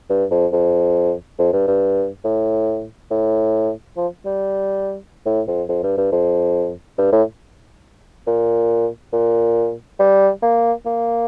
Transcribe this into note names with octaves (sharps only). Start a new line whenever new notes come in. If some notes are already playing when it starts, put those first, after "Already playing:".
G2
F2
F2
F2
G2
G2
A2
A2
F3
G3
A2
F2
F2
G2
G2
F2
G2
A2
A#2
A#2
G3
A#3
A#3